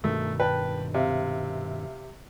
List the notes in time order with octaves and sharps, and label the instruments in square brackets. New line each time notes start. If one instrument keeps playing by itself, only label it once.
[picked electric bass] G2 B2 D#3 [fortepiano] A3
[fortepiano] B4 [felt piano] G5 A5
[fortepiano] C3 [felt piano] E5 F5